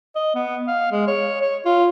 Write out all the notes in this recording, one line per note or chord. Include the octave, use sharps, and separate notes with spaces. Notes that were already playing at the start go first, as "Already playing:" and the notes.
D#5
B3
F5
G#3
C#5
C#5
F4